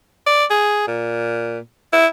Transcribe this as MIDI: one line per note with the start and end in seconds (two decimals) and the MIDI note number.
0.27 0.45 74
0.50 0.83 68
0.87 1.59 46
1.93 2.06 64